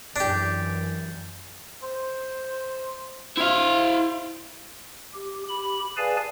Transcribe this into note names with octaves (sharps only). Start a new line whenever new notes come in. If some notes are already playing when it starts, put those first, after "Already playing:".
F#2 E3 D4 G4
C5
E4 C5 F5
G4
G4 B5
G#4 B4 D5 F5 G#5 A5